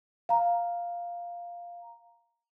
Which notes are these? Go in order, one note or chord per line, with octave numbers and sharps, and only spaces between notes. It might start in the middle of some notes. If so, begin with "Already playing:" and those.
F5 A#5